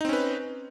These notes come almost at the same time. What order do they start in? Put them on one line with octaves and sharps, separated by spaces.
D#4 C4 C#4 B4